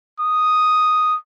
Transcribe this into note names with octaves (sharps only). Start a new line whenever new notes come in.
D#6